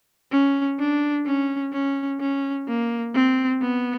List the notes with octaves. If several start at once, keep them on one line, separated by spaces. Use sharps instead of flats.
C#4
D4
C#4
C#4
C#4
A#3
C4
B3